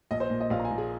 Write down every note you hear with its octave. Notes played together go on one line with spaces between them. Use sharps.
A#1 D#5
C5
A#2
D#5
A#1 F5
A#5
G#5
A#2
G#4